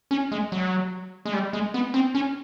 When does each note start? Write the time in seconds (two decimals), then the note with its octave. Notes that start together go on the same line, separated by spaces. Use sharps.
0.11 C#4
0.32 G#3
0.52 F#3
1.25 G#3
1.33 G3
1.53 G#3
1.74 B3
1.94 C4
2.15 C#4